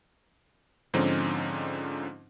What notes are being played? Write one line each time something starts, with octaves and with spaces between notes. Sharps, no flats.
G#2 D3 F3 C4 C#4 D#4